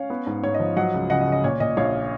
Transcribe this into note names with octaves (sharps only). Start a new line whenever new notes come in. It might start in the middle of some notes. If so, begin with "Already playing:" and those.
Already playing: C#4 C#5 F5
B3
G#2
G#2 C#5
D#5
F3
F#3 D#5 F#5
C#2
C#3 D#5 F#5
D#5
C#3
D#5
A#2 C#5
A#2 D#5
A#1 C#5 F5